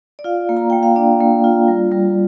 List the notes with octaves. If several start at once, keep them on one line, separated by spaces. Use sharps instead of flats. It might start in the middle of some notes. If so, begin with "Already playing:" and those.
D5
F4 F5
A#3
A#5
A#3 G5
F5
D4 D5
A#3
F4
G3
G3